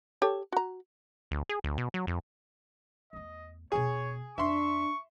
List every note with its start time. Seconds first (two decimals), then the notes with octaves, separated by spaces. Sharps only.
0.22 G4 A4 C#5
0.52 F#4 A#5
1.31 D2
1.49 G#4
1.64 D2
1.78 B2
1.94 F#3
2.07 F2
3.13 E2 A3 D#5
3.72 E1 B2 G#4 C#5
4.38 F2 D4 E5 C6 C#6